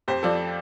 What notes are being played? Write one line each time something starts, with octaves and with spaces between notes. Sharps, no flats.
F2 G4 C5
F3 A4 D5